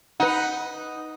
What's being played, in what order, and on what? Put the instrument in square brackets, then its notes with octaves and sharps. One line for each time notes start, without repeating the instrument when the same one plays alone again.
[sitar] D#4 [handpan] B4 F#5